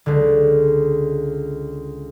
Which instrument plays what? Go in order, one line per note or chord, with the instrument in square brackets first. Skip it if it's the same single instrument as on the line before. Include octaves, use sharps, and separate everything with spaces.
[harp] C#2 D3